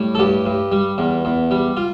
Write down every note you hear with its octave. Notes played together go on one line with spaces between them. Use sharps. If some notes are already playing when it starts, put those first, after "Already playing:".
Already playing: A2 G3
A4
G2 G4
G2
G3
E2
E2
G3
F4